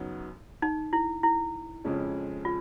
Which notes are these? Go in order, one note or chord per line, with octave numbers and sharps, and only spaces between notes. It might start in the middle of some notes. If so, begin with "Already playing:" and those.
Already playing: F#2 C#3 F#3 B3 D#4
D#4
E4
E4
F2 C#3 F3 G#3 C#4
F4